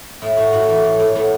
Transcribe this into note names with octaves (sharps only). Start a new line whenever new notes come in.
A2 E4
A2 F#4
A2 F#4
E3
A2
A2
A2 B3